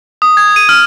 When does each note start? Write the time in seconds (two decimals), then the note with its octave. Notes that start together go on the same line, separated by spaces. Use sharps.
0.22 D#6
0.37 G#6
0.56 D#7
0.69 F6